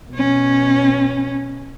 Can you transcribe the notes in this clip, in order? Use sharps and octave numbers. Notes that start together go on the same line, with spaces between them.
B2 C#4